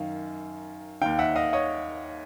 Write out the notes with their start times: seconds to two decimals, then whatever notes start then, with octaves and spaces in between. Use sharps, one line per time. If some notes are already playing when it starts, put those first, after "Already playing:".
Already playing: F#2 D#3 F5
1.02 D#2 D#3 F5 G5
1.19 E5 F#5
1.36 D#5 F5
1.53 C#5 D#5